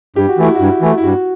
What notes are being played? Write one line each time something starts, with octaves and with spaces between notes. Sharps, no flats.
G2 G4
F#4
E3 A3 E4
G2 F#4
E3 A3
E4
G2 F#4